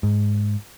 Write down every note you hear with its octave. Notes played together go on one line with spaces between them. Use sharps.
G#2